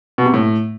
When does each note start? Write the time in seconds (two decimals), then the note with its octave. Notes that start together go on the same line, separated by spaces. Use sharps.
0.18 B2
0.26 C3
0.34 A2